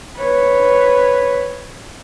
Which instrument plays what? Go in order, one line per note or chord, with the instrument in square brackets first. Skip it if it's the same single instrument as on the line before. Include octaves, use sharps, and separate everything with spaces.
[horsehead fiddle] B4 C#5